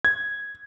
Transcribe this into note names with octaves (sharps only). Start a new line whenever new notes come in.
G#6